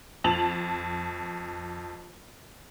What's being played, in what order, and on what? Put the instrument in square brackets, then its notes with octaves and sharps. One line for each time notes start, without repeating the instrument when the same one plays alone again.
[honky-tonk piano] F2 A5 F7 F#7